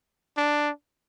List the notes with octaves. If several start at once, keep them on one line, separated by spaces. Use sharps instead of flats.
D4